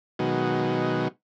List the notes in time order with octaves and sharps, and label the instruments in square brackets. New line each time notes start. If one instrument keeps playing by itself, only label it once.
[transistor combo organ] B2 D#3 F#3 G#3